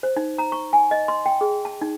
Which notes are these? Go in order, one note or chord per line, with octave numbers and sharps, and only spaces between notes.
C5
D#4
A#5
C#6
G#5
D#5
C6
G5
G#4
A5
D#4